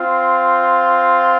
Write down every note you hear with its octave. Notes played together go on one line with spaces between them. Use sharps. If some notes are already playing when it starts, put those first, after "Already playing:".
Already playing: C4 F4